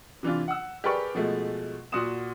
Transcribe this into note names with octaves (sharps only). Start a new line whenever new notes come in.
C3 E3 D4 F4
F#5 E6
G4 G#4 A#4 B4 D5 C#6
B2 F3 G#3 A3
A#2 F#4 F#5 C6 D#6 E7